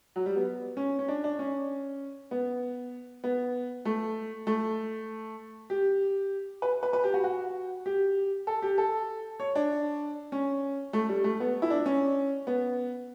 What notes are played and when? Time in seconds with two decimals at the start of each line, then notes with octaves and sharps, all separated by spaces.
0.16 F#3
0.26 G3
0.36 B3
0.77 C#4
0.99 C#4
1.08 D4
1.24 D4
1.39 C#4
2.31 B3
3.24 B3
3.85 A3
4.47 A3
5.70 G4
6.62 B4
6.83 B4
6.93 B4
7.04 G4
7.14 F#4
7.24 F#4
7.86 G4
8.47 A4
8.62 G4
8.78 A4
9.40 C#5
9.55 D4
10.32 C#4
10.93 A3
11.09 G3
11.24 A3
11.40 B3
11.62 E4
11.70 D4
11.86 C#4
12.47 B3